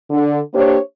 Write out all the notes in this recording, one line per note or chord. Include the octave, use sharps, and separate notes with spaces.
D3
A#3 D4 G4 C5 C#5